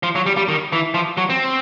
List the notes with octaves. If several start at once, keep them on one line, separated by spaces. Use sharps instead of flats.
F3
F#3
G3
G3
D#3
E3
F3
F#3
C4